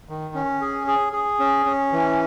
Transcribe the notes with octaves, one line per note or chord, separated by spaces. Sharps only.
D#3
C#4
G#4
G#4
G#4
C#4
C#4
E3